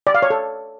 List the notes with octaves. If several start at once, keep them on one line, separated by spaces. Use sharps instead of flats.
D5
F5
C#5
A4